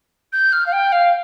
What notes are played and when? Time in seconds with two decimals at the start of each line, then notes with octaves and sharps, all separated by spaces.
0.33 G6
0.53 F6
0.66 F5
0.72 G5
0.92 F5